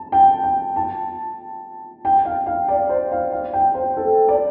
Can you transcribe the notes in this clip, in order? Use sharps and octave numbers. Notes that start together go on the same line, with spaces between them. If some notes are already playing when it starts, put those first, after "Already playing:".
Already playing: A5
G5
G5
A5
G5
F5
F5
D5
C5
F5
F5
G5
C5
A4
D5